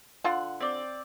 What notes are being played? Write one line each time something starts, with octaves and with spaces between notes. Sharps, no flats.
D3 F4 F#5
C4 D5